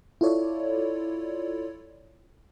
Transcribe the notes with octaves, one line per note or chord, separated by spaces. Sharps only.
E4 F4 A4 C#5 D5